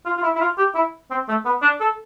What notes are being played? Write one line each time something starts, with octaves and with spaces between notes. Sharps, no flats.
F4
F4
E4
E4
F4
G4
E4
C4
A3
B3
D4
A4